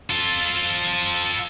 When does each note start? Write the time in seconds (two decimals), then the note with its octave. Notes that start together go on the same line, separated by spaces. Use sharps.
0.10 F4 A4